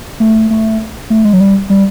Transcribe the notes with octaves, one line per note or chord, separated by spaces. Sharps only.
A3
A3
A3
G#3
F#3
G3
G3